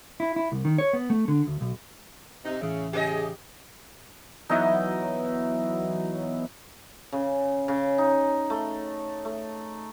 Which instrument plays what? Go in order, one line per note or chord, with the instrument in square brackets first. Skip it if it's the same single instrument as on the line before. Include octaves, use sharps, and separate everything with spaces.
[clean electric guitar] E4
E4
C2
D#3
C#5
B3
A3
D3
D2
B1
[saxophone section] C3 D#4
[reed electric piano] A2 E3 E5 [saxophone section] C#3
[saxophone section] C#3 G4 [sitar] G#4 B4 D#5
[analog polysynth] E3 F#3 B3 [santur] D#4 E4 D#5
[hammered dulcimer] C#3
C#3
D#4
A3
A3